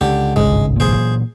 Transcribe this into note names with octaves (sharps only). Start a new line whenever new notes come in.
C#2 D3 G4
G1 C2 G#2 G#3
A#2 E3 F#3 G#4 C5